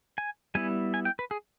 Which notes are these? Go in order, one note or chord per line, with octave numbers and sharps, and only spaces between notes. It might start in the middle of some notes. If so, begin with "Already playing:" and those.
G#5
G3 B3 E4 G#5
G#5
G5
B4
G#4